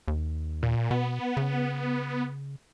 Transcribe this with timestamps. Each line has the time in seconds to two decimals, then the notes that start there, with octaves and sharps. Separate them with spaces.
0.08 D#2
0.63 A#2
0.91 B2 B3
1.37 C#3